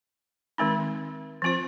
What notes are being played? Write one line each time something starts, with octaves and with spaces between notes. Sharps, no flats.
D#3 G#3 C4 D#4
F3 C4 F4 C5